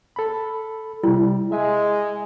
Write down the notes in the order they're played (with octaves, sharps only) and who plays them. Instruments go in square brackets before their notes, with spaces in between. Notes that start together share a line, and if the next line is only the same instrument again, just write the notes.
[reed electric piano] A4 B5
[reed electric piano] C3 G3 [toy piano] E4
[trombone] G#3 [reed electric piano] E5 G#5